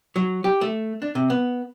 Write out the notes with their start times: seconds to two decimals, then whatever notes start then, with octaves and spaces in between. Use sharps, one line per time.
0.16 F#3
0.44 G4
0.61 A3
1.02 D4
1.15 C3
1.30 B3